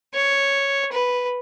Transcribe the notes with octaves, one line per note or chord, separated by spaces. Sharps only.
C#5
B4